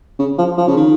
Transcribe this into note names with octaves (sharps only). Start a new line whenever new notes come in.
C#3
F3
F3
C#3
D#3